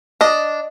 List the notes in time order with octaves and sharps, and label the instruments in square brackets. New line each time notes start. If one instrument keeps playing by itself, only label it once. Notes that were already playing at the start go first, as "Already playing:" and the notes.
[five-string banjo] D4 D#5